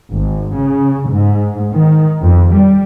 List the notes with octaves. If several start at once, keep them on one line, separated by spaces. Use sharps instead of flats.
G#1
C#3
G#2
D#3
F2
G3